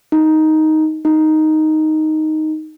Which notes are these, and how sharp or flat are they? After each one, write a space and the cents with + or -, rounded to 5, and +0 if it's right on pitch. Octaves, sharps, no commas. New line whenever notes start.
D#4 +5
D#4 +0